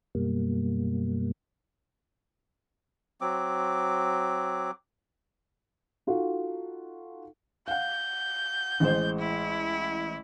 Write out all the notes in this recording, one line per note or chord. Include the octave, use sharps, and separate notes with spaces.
F#2 B2 G3 A#3
F#3 C4 D6
D#4 F4 F#4 A4
F5 F#5 G6
A1 G#3 C5
E4